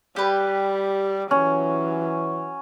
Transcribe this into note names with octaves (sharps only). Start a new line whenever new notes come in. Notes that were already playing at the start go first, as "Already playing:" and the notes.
G3 G4 B4
E3 F#3 C#4